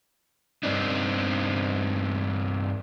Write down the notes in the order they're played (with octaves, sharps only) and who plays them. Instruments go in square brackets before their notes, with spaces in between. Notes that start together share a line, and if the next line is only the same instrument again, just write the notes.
[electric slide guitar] G2 G3 C4 D4 D#4